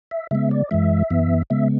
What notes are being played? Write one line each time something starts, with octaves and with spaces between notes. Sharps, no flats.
E5
C#3 G#3 B3 E5
D5
F#2 E3 G#3 E5
F#2 E3 B3
C#3 G#3 B3 E5